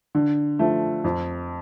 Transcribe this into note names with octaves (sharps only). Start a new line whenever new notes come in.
D3
F3 A3
F2